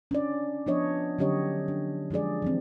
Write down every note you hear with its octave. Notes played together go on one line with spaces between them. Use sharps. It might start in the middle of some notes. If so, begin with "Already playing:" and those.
C#4 D4 D5
F3 B3 D4 C#5 D#5
D3 F#3 C#4 G4 C#5 D#5
D4
F3 G#3 D4 G#4 D5
E3 F3 C4